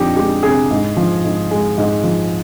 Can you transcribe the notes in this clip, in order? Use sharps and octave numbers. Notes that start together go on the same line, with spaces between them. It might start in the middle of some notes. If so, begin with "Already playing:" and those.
Already playing: F2 F3 D4 D#4 G4
G#3 G4
C3 G#4
G#2
F3
G#2
G#3
G#2
F3